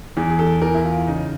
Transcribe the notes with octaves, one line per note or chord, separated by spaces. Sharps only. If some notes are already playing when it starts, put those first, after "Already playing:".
E2 G#4
G#4
A4
E2 A#4
E4
F4
C#3 D#4